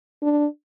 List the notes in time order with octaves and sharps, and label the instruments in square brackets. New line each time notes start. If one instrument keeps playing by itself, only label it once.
[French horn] D4